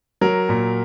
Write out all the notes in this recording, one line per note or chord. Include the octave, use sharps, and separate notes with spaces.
F#3 A#4
A#2